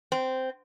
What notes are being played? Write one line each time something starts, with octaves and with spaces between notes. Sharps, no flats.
C4